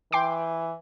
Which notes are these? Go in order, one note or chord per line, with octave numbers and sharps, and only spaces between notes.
E3 G5 C6 D6